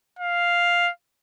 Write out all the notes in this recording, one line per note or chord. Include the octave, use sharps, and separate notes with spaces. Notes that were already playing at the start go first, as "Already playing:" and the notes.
F5